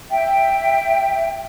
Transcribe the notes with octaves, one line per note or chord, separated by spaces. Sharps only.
E5 G5